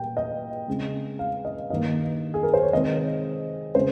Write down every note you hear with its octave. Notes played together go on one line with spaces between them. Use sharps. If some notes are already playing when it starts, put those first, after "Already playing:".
Already playing: A#2 G3 A#3 G5
D#5
C#3 G#3 C4
F5
D#5
G2 D#3 A#3 D#5
G#4
A#4
C5
C#5
C3 D#3 G#3 C4 D#5
C#3 G#3 C4 C5